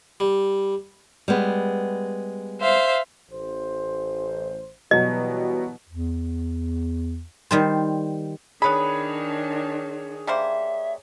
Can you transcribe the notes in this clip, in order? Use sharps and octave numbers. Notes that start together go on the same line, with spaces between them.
G3
G3 G#3 B3
C5 E5 F5
A1 C5
B2 E3 F#3 G3 B3 D#5
E2
D#3 G3 C5
D#3 B3 D4 G#4 B4 C#5 B5
G3 A#3 C5 E5